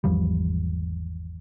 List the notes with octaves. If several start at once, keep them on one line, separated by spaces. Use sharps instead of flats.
G#1 E2 F3 G3